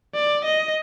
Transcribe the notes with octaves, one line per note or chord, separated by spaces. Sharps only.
D5
D#5